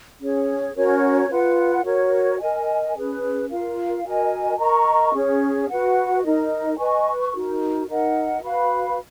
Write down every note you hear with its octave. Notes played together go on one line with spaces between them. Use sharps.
C#4 G#4 C#5
C#4 F#4 A#4 C#5
F4 B4 F#5
F#4 A#4 C#5
A#4 D#5 G#5
C#4 G#4 B4
F4 A#4 F5
F#4 A#4 D#5 G#5
A#4 D#5 A#5 C#6
C#4 G#4 C#5
F#4 B4 F#5
D#4 A#4 D#5
B4 D#5 G#5 C#6
D#4 F#4 A#4
D#4 A#4 D#5 F#5
F#4 B4 F5 B5